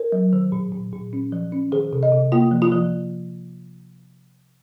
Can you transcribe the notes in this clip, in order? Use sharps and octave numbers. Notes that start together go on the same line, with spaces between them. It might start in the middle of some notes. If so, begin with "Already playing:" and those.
Already playing: A#4
F#3
D#3
A#2
A#2
A#2
C#4
F3
C#4
D#3 G#4
C3
D#5
C3
A#3 F4
F3
F4
F3